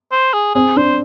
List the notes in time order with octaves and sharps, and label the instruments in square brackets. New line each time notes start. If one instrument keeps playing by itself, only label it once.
[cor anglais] C5
G#4
[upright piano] C4 [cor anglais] G#4
[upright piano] D4 [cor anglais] C5